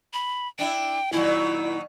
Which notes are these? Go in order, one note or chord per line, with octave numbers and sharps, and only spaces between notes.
B5
D4 E4 G5
A#2 D#3 F#3 E4